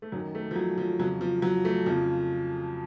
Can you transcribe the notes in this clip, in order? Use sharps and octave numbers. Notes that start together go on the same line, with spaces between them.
A3
F#2 D#3 F#3
A3
F3
F#3
F3
F2 C#3 F#3
F3
F#3
A3
F2 C#3 F3